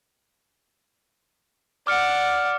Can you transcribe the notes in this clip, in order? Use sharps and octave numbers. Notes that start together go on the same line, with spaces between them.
D5 F#5 D6 F6 C#7